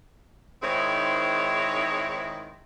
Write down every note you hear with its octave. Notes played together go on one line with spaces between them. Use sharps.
G#2 D#3 C4 E4 G#4 C#5